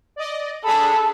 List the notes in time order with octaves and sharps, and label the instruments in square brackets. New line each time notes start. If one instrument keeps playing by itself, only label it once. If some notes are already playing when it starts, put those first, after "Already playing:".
[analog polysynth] D5 D#5
[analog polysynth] D4 G#4 B5 [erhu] A4